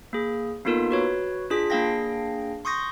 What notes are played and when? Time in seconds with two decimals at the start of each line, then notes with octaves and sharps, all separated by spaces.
0.13 A#3 G#4
0.65 A#3 B3 D#4 F4 A4 A#4
0.91 F#4 B4 C#5
1.50 D4 F4 G#4 B6
1.70 A#3 D4 G#4 F5 G5 A#6
2.65 C6 C#6 D#6 G6 A#6